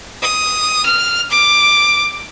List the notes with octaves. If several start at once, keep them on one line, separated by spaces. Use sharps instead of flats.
D#6
F6
D6